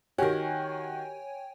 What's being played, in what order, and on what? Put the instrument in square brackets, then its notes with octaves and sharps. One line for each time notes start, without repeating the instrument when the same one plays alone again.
[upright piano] D#3 F#4 [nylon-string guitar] G4 A#4 [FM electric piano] C#5 G5 G#5